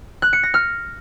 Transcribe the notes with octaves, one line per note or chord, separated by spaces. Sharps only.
F#6
C#7
A#6
F6